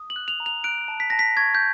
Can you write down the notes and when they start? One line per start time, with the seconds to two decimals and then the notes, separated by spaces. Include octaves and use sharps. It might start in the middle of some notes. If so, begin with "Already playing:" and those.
Already playing: D#6
0.10 F#7
0.16 F#6
0.28 F7
0.40 A#5
0.46 F7
0.64 F#6 D7
0.88 A5
1.00 B6
1.10 A5 A#6
1.19 B6
1.37 C#6 G#6
1.55 G6